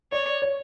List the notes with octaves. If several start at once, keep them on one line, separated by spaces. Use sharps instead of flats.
C#5 D5
C#5